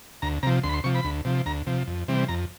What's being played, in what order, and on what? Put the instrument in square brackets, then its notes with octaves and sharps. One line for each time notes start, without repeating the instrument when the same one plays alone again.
[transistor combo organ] D2 A#5
C3 A#5
F3
D2 C6
B5
C6
C3 F3 C#6
B5
D2
C3 F3
D2 A#5
C3 F3
F2
C3 E3 G3 C4
F2 A#5